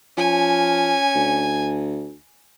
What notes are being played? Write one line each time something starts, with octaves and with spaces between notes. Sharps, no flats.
F3 C#4 G#5
D2